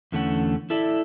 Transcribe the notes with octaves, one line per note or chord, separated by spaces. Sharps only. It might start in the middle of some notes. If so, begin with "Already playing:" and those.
E2 D3 A3 C#4 F#5
E4 A4 D5 E5